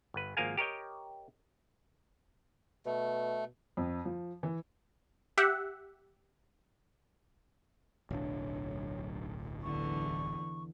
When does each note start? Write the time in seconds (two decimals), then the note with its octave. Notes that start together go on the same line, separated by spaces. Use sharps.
0.14 G1 B4
0.37 G#1 F3 A#3 A#4 F5 G#5
0.57 G4 A#4 C#5 D#5 G5
2.86 B2 A3
3.77 F2
4.05 F3
4.43 E3
5.38 G4 E5 F#5
8.11 D1 B1 D4 C#5
9.63 E2 D3 E3 C#6